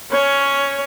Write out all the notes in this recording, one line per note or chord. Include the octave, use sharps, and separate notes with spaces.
C#4 C#5